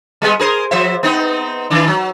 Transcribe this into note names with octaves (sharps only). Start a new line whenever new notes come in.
G3 G#3 B3
G#4 A#4 C5
F3 C5 E5
B3 C4 D#4
D#3 E3 D4
F#3